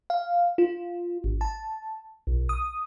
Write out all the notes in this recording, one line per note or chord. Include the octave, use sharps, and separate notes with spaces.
F5
F4
G#1
A5
B1
D#6